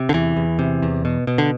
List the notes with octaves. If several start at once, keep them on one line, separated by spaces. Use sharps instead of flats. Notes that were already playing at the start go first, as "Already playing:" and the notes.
Already playing: C3
D3
E2 E3
E2
C3
E2
B2
B2
D3